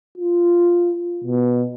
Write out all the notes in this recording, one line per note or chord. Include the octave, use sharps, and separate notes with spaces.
F4
B2